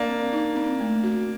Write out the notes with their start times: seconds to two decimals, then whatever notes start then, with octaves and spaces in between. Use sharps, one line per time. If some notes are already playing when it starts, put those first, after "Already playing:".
Already playing: A#3 D4
0.09 C4
0.33 D#4
0.56 C4
0.80 A3
1.03 F#4